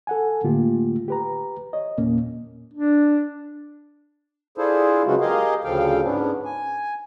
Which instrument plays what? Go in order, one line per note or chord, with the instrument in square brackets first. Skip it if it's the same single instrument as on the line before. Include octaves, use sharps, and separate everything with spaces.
[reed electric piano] A4 F#5 G#5
A2 D3 A3 A#3 F4 G4
G4 B4 A#5
C#5 D#5
E2 A#2 A#3 C#4
[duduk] D4
[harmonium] D4 E4 F4 G#4 A4 C5
C#3 F#3 G#3 B3 F4 F#4
G4 G#4 A#4 D#5 F5
D2 C#3 F3 A4 F5 G5
G#2 B3 C#4 D4
G#5